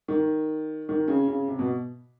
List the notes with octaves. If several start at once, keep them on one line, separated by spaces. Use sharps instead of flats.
D#3
D#3
C#3
C#3
C3
B2